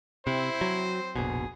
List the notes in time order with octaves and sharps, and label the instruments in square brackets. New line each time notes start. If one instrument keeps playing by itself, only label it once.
[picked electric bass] C3 [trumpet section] C4 C5 [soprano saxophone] E4
[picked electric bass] F#3
[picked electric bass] F1 A#1 B2 [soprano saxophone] G#4